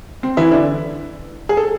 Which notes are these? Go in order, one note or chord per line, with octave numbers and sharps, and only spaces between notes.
C4
E3 E4
D3 D4
G#4
A4